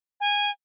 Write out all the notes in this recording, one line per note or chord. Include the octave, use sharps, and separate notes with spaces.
G#5